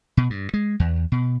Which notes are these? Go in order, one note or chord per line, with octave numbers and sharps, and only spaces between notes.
B2
G2
G#3
E2
B2